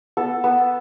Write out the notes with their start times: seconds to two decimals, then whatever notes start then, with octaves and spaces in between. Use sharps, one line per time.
0.17 B3 A4
0.44 B3